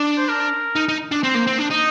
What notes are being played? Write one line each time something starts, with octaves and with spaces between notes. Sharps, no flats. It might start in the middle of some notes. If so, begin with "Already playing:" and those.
Already playing: D4
C5
A#4
D#4
D#4
D4
C4 C5
A#3
C4
D4
D#4 D#5